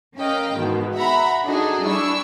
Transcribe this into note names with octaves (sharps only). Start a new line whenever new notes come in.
C#4 A#4 D#5 F5 G5
G#2 B2 D#3 E3
E5 F#5 A#5 B5
D4 D#4 F#4 G#4 A4 D#5
G3 D4 E4 C#6 E6